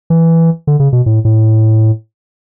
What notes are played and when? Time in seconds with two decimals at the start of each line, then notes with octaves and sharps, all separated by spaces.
0.10 E3
0.67 D3
0.80 C#3
0.93 B2
1.06 A2
1.25 A2